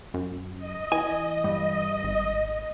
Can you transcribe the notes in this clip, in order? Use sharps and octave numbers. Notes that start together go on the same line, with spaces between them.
F#2
D#5
E3 G#5
G2
G#1